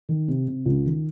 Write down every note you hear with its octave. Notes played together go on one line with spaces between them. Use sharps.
D#3
C3
C3
C#2
D#3